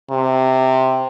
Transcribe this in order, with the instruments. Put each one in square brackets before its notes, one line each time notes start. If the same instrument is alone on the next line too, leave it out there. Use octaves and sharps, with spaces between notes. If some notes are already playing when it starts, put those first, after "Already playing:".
[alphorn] C3